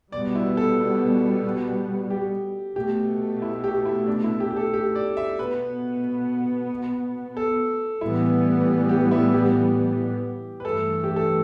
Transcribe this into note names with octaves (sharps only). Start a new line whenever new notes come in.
B2 G3 B3 D5
E4
A4
G4
B2 A3 G4
E4
G4
E4
D4
E4
G4
G4
A4
G4
D5
E5
B2 B3 B4
A4
A2 E3 G3 B3 E4
G4
E4
G4
B4
G2 E3 A3 A4
G4
A4